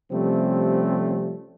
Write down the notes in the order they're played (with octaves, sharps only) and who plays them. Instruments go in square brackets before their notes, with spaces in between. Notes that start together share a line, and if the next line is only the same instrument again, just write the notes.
[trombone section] C3 F3 G3 A3 C4 C#4